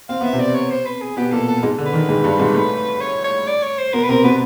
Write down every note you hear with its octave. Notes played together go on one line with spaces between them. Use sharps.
C4 F5
B3 E5
C3 C4
D5
C#5
C5
B4
G#4
B2 B3 G4
A#2 A#3 A4
A4
G#2 G#3
D3
B4
D#3
G#2 G#3
G2 G3
G#2 G#3
A2 A3
C#5
C#5
D5
C#5
C5
B2 B3 A#4
B4
C3 C4 A#4
B2 B3 B4